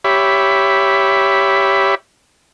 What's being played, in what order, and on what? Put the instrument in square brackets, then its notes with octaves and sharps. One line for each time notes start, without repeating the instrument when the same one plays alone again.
[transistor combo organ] G4 C#5 E5 B5